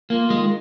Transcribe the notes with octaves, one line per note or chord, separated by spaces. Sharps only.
A#3 F4
D#3 G#3